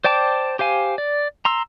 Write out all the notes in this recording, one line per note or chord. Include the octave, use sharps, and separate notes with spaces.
C5 D5 G5 A5 D6
G4 C5 F5 G#5
D5
A#5 C6 E6